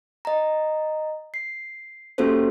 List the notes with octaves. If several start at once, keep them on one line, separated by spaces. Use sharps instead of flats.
D#5 A#5
C7
A#3 C#4 F#4 G4 A4 C5